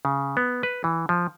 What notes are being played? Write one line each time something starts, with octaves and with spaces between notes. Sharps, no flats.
C#3
B3
B4
E3
F3